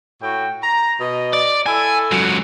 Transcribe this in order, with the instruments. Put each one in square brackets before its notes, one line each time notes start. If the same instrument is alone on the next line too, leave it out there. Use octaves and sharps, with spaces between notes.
[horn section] A2 F#4 G5
A#5
B2 D#5
[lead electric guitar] D5
[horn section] E4 A4 [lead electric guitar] G#5
[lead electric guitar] C#2 F#3